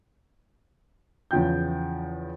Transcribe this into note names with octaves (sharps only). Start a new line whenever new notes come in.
E2 C#3 F3 G5 G6